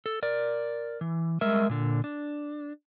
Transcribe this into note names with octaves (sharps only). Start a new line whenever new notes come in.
A4
A#4 D5
E3
G3 G#3 A#4 E5
A#2 D3
D4